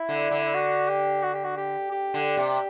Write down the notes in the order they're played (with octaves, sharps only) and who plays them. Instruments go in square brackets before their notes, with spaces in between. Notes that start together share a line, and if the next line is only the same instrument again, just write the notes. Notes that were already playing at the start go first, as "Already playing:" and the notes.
Already playing: [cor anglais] E4
[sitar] D3
D3
[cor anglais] F#4
G4
F#4
G4
F#4
G4
G4
[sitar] D3
C3